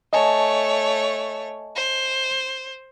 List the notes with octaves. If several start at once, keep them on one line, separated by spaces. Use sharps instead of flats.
A3 C#5 D#5 G#5 A5
C5